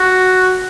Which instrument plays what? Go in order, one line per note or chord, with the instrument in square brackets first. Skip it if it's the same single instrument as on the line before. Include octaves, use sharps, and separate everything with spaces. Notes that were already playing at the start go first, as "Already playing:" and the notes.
Already playing: [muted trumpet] F#4